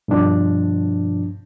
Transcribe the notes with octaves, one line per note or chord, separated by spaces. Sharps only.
G2 B2 F3 D4